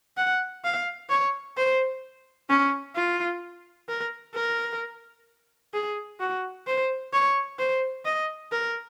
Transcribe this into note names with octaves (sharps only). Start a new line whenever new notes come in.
F#5
F5
C#5
C5
C#4
F4
A#4
A#4
G#4
F#4
C5
C#5
C5
D#5
A#4